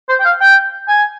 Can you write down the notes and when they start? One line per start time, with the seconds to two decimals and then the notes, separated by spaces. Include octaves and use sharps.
0.09 C5
0.20 G5
0.25 F5
0.41 G5
0.88 G#5